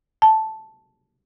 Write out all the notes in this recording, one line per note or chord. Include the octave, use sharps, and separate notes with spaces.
A5